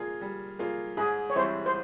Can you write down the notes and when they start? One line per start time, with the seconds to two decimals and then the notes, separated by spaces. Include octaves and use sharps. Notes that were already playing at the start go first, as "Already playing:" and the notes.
Already playing: A#3 F4 G#4
0.21 G3
0.59 A#3 F4 G#4
0.97 G#2 G#4
1.30 C#5
1.35 E3 G3 C4 E4 C5
1.66 C5